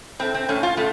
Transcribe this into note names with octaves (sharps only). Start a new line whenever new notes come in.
A2 A3 C4
C4
A2 A3 C#4
F4
A2 A3